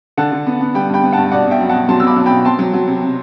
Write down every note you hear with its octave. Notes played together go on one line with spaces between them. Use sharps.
D3 F#5 A5
D3
B3
B3
G3 G5 B5
G2 G5 B5
B3
G2 F#5 A5
B2 D5 F#5
B2 E5 G5
F#3
B2 F#5 A5
F#3 A5 C6
E6
B2 B5 D6
F#3
G5 B5
B2
C4 A5 C6
F#3
F#3
C3
C3